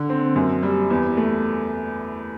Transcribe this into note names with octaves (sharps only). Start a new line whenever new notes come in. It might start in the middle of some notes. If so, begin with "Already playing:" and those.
Already playing: D3
C4
F#2
G3
E2
A3